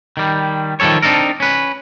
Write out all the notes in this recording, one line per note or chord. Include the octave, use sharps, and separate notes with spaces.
D#3 G3
D#3 F3 G3 A4 C#5
C4 D4 D#4 A4 A#4
C#4 B4